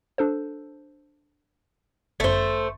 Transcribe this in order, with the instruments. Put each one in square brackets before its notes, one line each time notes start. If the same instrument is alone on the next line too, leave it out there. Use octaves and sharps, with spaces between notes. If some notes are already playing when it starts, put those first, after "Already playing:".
[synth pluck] D4 A4 C5
[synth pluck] G1 F#2 [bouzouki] A3 C5